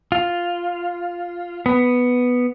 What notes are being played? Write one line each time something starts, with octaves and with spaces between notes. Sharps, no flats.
F4
B3